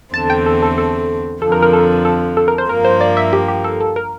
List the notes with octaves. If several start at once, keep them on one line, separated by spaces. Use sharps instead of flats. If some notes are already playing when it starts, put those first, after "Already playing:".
E2 D3 A3 C4 A5
G5
A4
A4
A4
F2 D3 F3 A4
A#4
A#4
A4
A4
A4
A#4
C5
G2 F3 A#3 A#4
C5
D5
E5
G4
G4
A4
A4
A#4